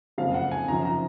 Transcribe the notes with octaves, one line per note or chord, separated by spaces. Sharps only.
F#1 F2 C#3 G#3 F5
F#5
G#5
F#2 C#3 F3 A#5
A#5